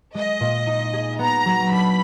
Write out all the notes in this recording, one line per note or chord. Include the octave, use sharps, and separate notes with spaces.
G#3 D#5
A#2
D#4
G#4
B3 A#5
F#3
D4 B5